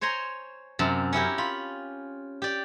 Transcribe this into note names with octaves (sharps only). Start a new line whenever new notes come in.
C5 C#5 G#5 A#5 C6
F#2 C3 A5
C#4 E4 G4 A#4
F4 B5
G4 D5